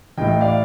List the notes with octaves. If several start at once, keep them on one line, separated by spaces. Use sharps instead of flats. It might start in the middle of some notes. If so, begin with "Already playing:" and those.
A1 A2 A3 D#5 G5
D5 F5